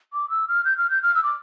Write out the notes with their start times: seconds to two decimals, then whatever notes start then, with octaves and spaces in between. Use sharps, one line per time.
0.13 D6
0.30 E6
0.48 F6
0.65 G6
0.78 F6
0.90 G6
1.03 F6
1.15 E6
1.24 D6